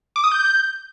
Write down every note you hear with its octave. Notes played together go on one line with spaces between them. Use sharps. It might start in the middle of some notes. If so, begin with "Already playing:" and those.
D6
D#6
G6